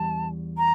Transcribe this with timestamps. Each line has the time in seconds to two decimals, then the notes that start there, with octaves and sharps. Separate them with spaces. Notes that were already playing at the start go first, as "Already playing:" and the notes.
Already playing: E2 G3 A5
0.58 A#5